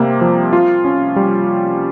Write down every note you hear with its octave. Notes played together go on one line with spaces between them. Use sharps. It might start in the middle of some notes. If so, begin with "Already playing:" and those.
Already playing: C3 G3 A#3
F3
F4
C#4
G3